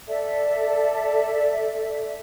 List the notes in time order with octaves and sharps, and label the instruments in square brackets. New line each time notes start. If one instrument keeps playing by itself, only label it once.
[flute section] A4 D5 E5